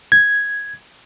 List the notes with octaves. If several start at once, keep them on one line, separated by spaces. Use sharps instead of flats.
G#6